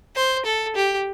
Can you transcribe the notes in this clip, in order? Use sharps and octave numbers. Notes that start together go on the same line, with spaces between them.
C5
A4
G4